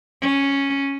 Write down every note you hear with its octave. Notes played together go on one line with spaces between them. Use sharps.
C#4